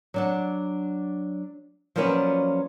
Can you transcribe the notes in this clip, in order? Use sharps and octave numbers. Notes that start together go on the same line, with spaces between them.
F#3 D4 F#5
F3 F#3 A#3 C#4 B4 D5